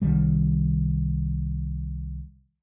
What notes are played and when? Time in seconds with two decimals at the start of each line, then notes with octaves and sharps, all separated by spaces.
0.02 C2 D#3 G3